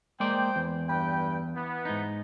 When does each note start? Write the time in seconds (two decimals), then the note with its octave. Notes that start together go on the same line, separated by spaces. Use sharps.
0.20 G#3 A#3 C5 D5 G5
0.56 E2
0.89 G2 B4 G5
1.56 E3 B3
1.85 G#2 D#4